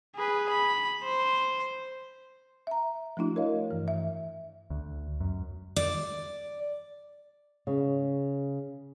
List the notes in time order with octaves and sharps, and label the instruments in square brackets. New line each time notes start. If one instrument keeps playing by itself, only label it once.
[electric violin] G#4 B4
B5
C5
[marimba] E5 A#5
F3 A3 D4 E4 F#4
A#4 C#5 D#5 F5
G2 E3
E5
[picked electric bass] D2
F#2
[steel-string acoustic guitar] D5
[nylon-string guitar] C#3